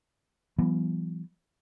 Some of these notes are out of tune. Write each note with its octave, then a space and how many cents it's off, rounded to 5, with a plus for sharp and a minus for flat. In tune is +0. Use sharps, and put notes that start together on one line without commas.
E3 +40 G3 -40 B3 +0